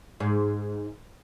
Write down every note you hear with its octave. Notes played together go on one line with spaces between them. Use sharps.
G#2